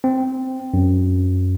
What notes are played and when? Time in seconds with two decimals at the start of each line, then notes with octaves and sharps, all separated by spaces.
0.04 C4
0.74 F#2